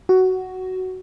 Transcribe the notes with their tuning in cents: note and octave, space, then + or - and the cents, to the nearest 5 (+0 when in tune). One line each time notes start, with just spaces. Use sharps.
F#4 +10